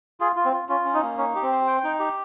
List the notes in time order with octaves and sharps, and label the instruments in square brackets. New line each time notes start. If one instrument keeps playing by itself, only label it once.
[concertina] F4 [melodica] G#4
[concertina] F4
[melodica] C4
[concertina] F4
[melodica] C#4 [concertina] F4
[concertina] C#4
[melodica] D#4
[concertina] A#3
[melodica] C#4 [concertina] D#4
[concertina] G4
[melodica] C4
[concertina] C5
G5
D#4
G4